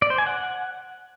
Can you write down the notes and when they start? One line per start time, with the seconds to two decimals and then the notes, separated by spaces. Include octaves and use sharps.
0.02 D5
0.10 C5
0.18 G#5
0.27 F#5